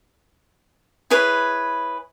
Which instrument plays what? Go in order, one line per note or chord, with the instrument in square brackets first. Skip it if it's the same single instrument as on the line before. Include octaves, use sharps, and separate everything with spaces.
[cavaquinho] E4 G#4 B4 C#5